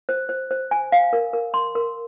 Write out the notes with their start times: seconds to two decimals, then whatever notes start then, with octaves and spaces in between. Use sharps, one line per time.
0.09 C5
0.29 C5
0.51 C5
0.71 G#5
0.92 F5
1.13 A#4
1.33 A#4
1.54 C6
1.75 A#4